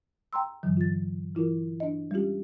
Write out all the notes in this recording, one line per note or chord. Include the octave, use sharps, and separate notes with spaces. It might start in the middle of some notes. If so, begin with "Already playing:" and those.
G5 A#5 C6 E6
G2 D3 E3 F#3
F4 A6
E3 E4 F4 A#4
D4 D#5
G3 G#3 C#4 F4 G4